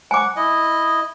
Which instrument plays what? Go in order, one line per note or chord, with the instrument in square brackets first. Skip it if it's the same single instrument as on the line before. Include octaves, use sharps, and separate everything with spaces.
[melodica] F#5 [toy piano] G#5 D6
[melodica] E4 D#5